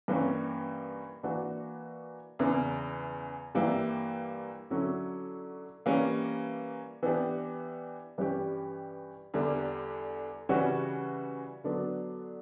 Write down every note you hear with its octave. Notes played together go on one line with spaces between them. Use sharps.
G2 E3 A#3 C#4
E3 A#3 D4 F#4
E2 C#3 E3
G2 E3 G3 A#3 E4
D3 F#3 C#4 E4
E3 G3 A#3 C#4
E3 B3 D4 G4
G2 E3 G3 C#4 G4
E2 D3 G3
C#3 E3 G3 C#4 F#4
D3 F#3 B3 D4